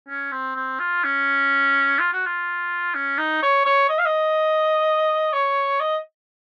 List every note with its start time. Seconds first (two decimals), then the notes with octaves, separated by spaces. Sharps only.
0.09 C#4
0.32 C4
0.56 C4
0.80 F4
1.04 C#4
1.99 F4
2.13 F#4
2.26 F4
2.95 C#4
3.18 D#4
3.42 C#5
3.65 C#5
3.89 D#5
3.99 F5
4.05 D#5
5.33 C#5
5.80 D#5